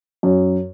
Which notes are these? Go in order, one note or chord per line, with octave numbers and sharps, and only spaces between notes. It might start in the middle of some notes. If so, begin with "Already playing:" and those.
F#2